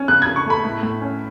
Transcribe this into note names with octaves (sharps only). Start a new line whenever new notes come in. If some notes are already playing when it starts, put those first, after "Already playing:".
Already playing: C#4
C#3 F#6
G#6
C#3
C#6
A3 B5
A2
A2
C#4